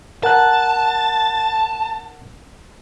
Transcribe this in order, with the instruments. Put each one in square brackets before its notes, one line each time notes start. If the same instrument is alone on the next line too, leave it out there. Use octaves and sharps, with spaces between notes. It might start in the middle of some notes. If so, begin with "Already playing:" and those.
[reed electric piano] A#4 F#5 F#6 [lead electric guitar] A5